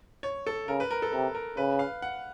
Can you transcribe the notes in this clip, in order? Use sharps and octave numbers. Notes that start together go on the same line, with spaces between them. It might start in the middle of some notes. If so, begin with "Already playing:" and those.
C#5
A4
C#3 A#4
B4
A#4
A4
C3 A#4
A#4
C#3 B4
F5
F#5